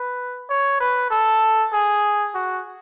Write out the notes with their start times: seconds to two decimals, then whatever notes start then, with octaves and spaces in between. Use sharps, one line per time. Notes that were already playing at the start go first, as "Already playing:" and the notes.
Already playing: B4
0.50 C#5
0.80 B4
1.11 A4
1.73 G#4
2.35 F#4